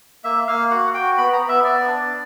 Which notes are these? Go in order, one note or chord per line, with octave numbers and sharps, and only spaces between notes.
A#3 E5
A#3 F5
F#4 F#5
F#4 G5
B3 B5
A#5
B3
E5
B3 D5
D4